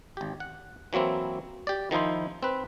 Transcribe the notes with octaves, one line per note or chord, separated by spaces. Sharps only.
G#1 G4
F#5
E3 F#3 A#3 C4 E4
G4 D5
D#3 F3 D#4 E4 C5
C4 B4